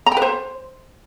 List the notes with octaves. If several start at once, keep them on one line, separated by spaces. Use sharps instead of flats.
A#5
G5
B4
C5